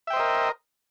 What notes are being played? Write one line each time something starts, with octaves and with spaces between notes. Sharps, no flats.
A#4 C5 D#5 E5 G5